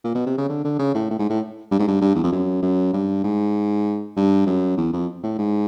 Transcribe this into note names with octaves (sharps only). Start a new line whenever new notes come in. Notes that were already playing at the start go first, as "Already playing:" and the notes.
A#2
B2
C3
C#3
D3
D3
C#3
A2
A2
G#2
A2
G2
G#2
G2
G2
E2
F2
F#2
F#2
G2
G#2
G2
F#2
E2
F2
A2
G#2